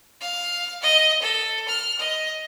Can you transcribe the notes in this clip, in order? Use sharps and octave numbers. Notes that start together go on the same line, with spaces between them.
F5
D#5
A4
F6
D#5